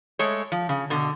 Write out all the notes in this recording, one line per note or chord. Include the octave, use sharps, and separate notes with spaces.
G#3 A3 C#5
F3
C#3
B2 D3